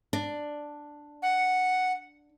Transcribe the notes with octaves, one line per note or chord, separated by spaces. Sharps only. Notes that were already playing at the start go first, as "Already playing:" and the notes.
D4
F#5